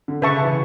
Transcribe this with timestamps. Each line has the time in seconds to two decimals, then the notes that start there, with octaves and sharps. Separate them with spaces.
0.08 D3
0.22 C#3 B4 E5 A5 C#6
0.45 E3